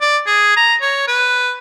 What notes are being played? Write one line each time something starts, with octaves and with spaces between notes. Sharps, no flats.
D5
G#4
A#5
C#5
B4